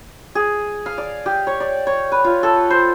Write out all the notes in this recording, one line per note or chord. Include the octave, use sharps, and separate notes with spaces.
G#4
F5
D5
G4
C#5
D5
C#5
B4
F4
A4
C5